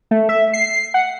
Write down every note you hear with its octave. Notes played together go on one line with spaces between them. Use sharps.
A3
E5
C7
F#5